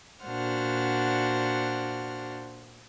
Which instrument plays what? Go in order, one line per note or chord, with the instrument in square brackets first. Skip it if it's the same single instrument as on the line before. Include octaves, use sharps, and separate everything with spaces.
[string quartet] A#2 D4 F#4 C5 F#5 F6